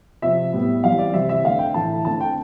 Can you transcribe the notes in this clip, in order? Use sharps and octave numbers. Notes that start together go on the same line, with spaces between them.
C3 F3 C4 E5
A2 G3 B3
E3 G3 C4 F5
D5
C3 E3 G3 C4 E5
E5
D3 A3 C4 F5
G5
A2 E3 A3 A5
D3 A3 C4 A5
G5